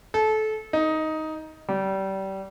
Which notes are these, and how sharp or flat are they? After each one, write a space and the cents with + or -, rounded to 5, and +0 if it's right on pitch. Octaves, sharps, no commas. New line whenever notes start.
A4 -25
D#4 +10
G3 -25